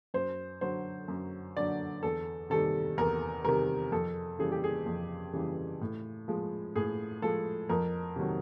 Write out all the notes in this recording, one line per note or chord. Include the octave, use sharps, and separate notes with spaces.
F#2 C5
D3 F#3 C5
F#2
D3 F#3 D5
E2 A4
C3 D#3 G3 A4
E2 A#4
C3 D#3 G3 A#4
F2 A4
C#3 E3 G3 G#4
G4
G#4
F2
C#3 E3 G3
A2
F3 G#3
A2 G#4
F3 G#3 A4
F2 A#4
C3 D#3 F#3